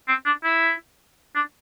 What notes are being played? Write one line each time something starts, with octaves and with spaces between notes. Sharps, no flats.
C4
D4
E4
D4